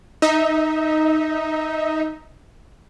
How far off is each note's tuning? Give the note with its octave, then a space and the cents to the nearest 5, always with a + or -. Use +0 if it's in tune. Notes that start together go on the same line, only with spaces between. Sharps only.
D#4 +0 E5 -30